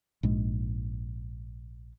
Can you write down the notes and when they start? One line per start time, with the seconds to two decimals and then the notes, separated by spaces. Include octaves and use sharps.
0.23 A#1 G#2 G#3